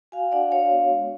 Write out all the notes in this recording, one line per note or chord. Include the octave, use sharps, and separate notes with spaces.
F#4 F5 G#5
D4 D5 F#5
F#4 C#5 F5
B3
G#3